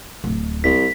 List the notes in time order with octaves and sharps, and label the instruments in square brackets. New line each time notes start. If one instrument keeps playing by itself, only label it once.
[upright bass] D1
[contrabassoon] C2 [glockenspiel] B6